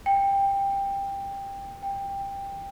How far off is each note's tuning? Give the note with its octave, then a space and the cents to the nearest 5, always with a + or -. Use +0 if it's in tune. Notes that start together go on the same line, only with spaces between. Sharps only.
G5 +15
G5 +15